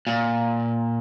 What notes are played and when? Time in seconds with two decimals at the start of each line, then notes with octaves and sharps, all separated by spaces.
0.07 A#2